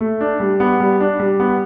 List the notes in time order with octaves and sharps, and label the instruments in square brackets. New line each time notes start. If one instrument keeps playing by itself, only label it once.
[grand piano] A3
D4
G3
B3
G3
D4
G3
B3